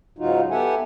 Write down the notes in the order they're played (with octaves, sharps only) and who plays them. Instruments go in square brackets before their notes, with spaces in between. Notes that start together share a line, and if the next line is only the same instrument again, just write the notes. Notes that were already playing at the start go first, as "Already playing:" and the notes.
[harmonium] G#2 C#3 F#3 D#4 F4 F#4
B3 G4 A4 E5 F#5 G#5